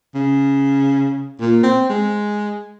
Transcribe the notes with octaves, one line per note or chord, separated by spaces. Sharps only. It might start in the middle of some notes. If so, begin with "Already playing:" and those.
C#3
A#2
C4
G#3